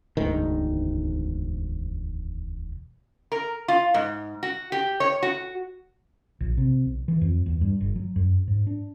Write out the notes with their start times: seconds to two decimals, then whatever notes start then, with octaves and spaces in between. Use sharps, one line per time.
0.17 E1 D2 G#2 D#3
3.32 A#4
3.68 F4
3.94 G#2
4.43 F#4
4.72 G4
5.00 C#5
5.23 F#4
6.41 A#1
6.57 C3
6.86 B1
7.08 E3
7.21 F2
7.46 E2
7.61 G2
7.81 G1
7.96 F#3
8.16 F#2
8.48 G#2
8.67 D4